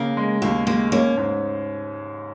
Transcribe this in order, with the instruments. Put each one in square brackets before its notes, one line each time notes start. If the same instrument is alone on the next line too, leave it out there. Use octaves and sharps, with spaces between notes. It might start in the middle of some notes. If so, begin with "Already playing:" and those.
Already playing: [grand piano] C#3 [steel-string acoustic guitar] A#3
[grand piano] G#3
[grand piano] D#2 [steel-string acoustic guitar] A#3
[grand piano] G#3 [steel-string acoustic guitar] A#3
[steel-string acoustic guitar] A#3 [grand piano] C#4
[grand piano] G#2